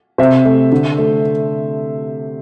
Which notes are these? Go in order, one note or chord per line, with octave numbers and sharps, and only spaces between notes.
C3 C5 E5
A3
D3
A3